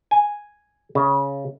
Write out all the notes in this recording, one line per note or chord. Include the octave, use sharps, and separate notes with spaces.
G#5
C#3